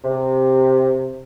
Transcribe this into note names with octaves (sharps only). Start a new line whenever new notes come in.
C3